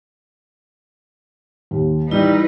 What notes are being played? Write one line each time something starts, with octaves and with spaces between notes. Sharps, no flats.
D#2
E3 G3 D#4 E4 B4